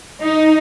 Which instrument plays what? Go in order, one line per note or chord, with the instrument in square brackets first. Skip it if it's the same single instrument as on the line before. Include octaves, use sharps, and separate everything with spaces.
[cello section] D#4